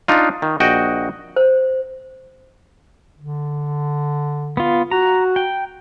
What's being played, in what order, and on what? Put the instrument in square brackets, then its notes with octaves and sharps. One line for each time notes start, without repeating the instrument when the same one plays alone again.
[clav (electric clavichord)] D4 D#4 F4
D#3
A#1 F#4 D#5 G5
[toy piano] C5
[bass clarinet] D3
[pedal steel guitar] B3 F4
[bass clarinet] F#4 [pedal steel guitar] A#5
[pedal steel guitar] G5